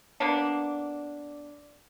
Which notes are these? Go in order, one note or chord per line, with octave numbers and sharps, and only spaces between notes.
A#3 B3 D4